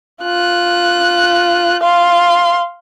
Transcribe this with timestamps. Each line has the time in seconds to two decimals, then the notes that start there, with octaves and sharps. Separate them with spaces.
0.23 F4 F#6
1.83 F5 C6